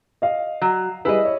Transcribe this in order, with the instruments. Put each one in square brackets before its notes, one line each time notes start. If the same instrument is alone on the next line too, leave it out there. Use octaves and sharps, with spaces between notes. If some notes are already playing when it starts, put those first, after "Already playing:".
[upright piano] D#5 F5
[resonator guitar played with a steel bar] F#3
[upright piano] G3 G#4 B4 [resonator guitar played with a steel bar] E4 D#5
[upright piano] C#5